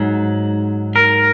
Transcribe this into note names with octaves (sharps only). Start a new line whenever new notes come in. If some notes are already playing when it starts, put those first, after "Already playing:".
Already playing: G#2 F#3
A#4